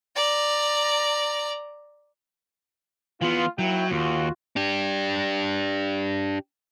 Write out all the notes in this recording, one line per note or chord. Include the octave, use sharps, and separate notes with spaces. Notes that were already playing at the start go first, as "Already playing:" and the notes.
D5 A#5
E3 B3 F4
D#2 F#3 E4 G5
D#2 F4 F#4
D4 G4